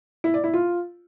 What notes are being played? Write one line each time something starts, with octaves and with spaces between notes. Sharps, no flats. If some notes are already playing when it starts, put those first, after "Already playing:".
E4
D5
E4
F4